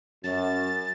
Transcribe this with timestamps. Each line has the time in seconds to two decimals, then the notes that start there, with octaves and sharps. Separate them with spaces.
0.24 F#2 A6